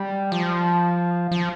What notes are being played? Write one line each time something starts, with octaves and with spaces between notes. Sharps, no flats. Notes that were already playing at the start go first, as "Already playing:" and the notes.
Already playing: G3
F3
F3